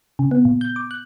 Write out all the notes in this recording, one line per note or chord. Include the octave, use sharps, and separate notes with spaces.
C#3
B3
A#2
G6
D6
F#6